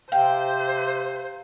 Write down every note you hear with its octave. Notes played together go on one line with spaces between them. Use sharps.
C3 C5 F5 G5